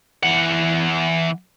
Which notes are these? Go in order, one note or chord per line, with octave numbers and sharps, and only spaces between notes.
E3 F#5